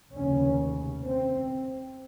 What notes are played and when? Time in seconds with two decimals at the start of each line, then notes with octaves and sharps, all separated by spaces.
0.13 F1 D#2 C#3 C#4
1.07 C4